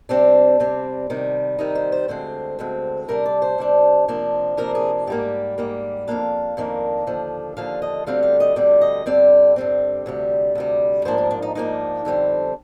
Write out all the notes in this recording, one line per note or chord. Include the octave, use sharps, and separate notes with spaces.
C3 G3 C4 D4
C3 G3 C4
C3 D#3 G3
C3 D#3 G3 D#4
C5
C5
D2 D3 G#3 C4 C5
D2 D3 G#3 C4
C3 G3 D4 A#4
D5
C5
C3 G3 D4
C3 F3 A#3 D4
C3 F3 A#3 D4 A#4
G#4
G#2 G3 A#3 G4
G#2 G3 A#3
F2 D#3 A#3 D4 F5
F2 D#3 A#3 D4
D#2 D3 F3
D#2 D3 F3 F5
D#5
D2 D3 G3 C4 F5
F5
D#5
D2 D3 G3 C4 D5
D#5
G2 D3 G3 C4 D5
G2 D3 G3 C4
D2 C3 G3
D2 C3 G3
G#2 F3 A#3 D4 C5
A#4
D4
D#4
G#2 F3 A#3 D4 D#4
F2 D3 G3 C4